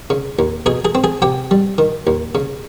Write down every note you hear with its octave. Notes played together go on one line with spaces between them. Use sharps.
C#3
D#2
B2 G#4 G#5
G#4 G#5
C4
G#4 G#5
C3 G4 G5
G3
D#3
D#2
C#3